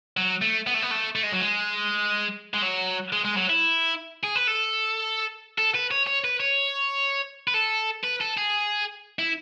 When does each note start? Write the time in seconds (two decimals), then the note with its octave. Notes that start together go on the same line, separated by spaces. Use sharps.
0.17 F#3
0.42 A3
0.67 B3
0.74 A3
0.82 B3
0.91 A3
1.16 A3
1.23 G#3
1.32 F#3
1.40 G#3
2.54 G#3
2.63 F#3
3.12 G#3
3.24 G#3
3.37 F#3
3.49 E4
4.23 G#4
4.35 B4
4.47 A4
5.58 A4
5.75 B4
5.91 C#5
6.07 C#5
6.24 B4
6.40 C#5
7.48 B4
7.54 A4
8.03 B4
8.20 A4
8.37 G#4
9.19 E4